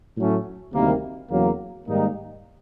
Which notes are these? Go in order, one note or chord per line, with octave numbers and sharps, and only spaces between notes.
A2 F#3 A3 C#4
D2 C3 D#3 G3 A#3
E2 C#3 F#3 A#3
G#2 D#3 G3 A#3 D#4